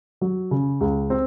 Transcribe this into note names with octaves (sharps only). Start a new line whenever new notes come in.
F#3
C#3
C#2
C4